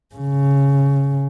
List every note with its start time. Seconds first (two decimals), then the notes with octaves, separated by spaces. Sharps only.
0.15 C#3